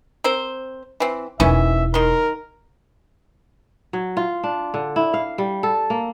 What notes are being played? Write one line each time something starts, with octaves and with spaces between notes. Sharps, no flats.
C4 A#4 C5
E3 C4
E1 D#3 E3 C#4 E4 E5
D#3 A#4 C6
F#3
F4
D4
D3
E4
F5
G3
A4
A#3